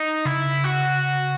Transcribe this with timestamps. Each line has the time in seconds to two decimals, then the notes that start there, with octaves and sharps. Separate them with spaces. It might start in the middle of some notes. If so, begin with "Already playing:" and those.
Already playing: D#4
0.25 C#3 E4
0.64 F#4